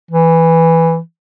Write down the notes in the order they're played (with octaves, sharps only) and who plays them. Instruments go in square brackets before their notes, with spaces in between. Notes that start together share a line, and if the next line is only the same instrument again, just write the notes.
[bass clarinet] E3